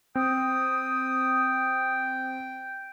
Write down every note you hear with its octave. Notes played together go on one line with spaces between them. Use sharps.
C4 G5 D#6